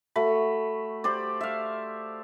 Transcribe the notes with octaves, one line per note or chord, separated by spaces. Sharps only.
A3 F#4 B5
G4 C5 D5
E5 F5